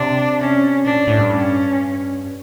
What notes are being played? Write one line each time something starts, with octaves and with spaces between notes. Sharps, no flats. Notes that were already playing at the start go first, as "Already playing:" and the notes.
Already playing: C3 D4
C#4
A#2 D4
A2
A2
G2
C#4